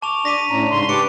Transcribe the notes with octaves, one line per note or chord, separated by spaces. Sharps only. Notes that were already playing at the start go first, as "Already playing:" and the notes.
A5 C#6 D6 F7
D4 A#6 B6 D#7
A2 C#4 A#5
G#2 C#3 C6
G4 B4 A5 D6 C#7